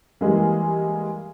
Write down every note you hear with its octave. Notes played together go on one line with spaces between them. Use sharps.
E3 G3 G#3 A#3